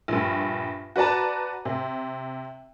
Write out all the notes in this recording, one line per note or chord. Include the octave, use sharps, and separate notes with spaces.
A#1 G2
F#4 B4 D5 A5 A#5
C3